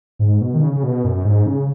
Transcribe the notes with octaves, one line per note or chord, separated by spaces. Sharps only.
G#2
B2
D#3
C#3
C#3
B2
F#2
G#2
C#3